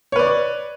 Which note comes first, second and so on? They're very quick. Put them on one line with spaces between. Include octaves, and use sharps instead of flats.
C#5 B4 D5